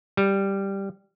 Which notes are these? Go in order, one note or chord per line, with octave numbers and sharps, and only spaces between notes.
G3